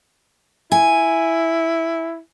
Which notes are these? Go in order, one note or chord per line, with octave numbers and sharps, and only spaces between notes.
E4 G#5